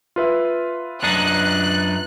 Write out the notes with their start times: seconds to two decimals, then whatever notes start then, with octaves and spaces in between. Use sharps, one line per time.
0.16 F4 B4 E5
1.03 F#2 D4 D#4 F#6